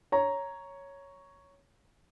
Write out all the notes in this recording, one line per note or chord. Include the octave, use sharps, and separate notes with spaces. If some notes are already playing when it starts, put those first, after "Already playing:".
C#5 A#5